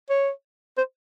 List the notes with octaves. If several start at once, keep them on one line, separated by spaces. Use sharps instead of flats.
C#5
C5